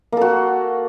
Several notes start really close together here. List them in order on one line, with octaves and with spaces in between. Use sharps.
A#3 A4 F#4